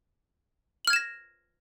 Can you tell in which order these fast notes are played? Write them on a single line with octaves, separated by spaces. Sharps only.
F#7 F6 G#6 E7 A#6